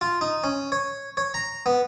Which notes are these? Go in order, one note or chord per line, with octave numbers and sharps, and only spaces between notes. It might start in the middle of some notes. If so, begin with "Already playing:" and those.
F4
D#4
C#4
C#5
C#5
A#5
B3